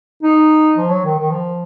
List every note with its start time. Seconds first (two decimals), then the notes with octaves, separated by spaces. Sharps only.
0.23 D#4
0.77 F3
0.90 F#3
1.05 D#3
1.18 D#3
1.31 F3